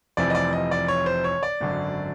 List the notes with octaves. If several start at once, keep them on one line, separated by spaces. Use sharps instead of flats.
F1 F2 C3 E3 D5
D#5
D5
D#5
D5
C#5
C5
C#5
D5
G#1 F#2 D3